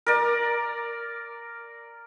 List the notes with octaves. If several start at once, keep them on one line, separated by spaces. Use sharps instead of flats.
A#4 D5